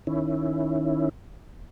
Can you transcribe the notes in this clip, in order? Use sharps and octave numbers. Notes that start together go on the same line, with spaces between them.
D#3 C#4 E4